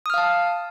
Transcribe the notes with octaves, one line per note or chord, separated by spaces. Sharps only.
F5 A5 D#6 F6